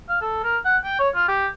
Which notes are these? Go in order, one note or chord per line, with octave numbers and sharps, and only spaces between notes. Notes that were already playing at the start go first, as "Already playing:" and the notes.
F5
A4
A#4
F#5
G5
C#5
F4
G4